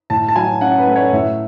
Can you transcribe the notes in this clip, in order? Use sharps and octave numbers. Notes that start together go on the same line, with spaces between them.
A2 A5
A5
F#3 G#5
C#4 F#5
B4
A3
C#5
A2 E5